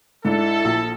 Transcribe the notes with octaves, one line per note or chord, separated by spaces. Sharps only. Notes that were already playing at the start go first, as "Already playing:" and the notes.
G#2 D4 E4 A4
A#1